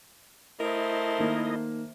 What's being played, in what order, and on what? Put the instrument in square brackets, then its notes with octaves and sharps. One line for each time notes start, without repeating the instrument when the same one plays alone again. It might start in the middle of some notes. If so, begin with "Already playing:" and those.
[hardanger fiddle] A3 C5 [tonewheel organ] E4 D#5 [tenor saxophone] A#4
[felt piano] D#3 A#3